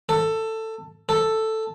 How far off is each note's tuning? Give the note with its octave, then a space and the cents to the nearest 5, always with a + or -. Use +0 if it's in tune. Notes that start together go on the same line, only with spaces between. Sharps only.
A4 +15
A4 +5